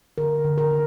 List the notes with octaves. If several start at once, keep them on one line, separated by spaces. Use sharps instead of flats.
D3 A#4
D3
A#4
D3